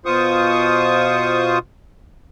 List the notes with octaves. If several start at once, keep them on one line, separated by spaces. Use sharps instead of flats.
B2 F4 C5 C#6 D#6